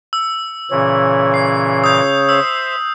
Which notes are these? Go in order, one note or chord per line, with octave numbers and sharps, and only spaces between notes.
E6
A#2 C#3 E3 C#5
C7
D#6 G6
C5 E5 E6